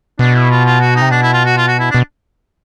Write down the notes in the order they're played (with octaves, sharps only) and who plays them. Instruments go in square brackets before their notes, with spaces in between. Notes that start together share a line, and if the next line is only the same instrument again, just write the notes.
[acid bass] B2 [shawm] D4
[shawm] E4
F4
F4
F#4
D#4
[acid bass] C3
[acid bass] B2 [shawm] D4
[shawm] E4
F4
F#4
F4
F#4
E4
D4
[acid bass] B2